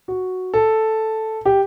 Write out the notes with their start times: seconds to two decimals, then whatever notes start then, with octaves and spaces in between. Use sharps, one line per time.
0.08 F#4
0.54 A4
1.45 G4